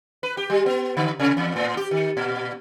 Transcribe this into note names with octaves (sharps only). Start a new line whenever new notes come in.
B4
G4
G3
B3
D3
C3
E2
A2
G4
D#3
A#2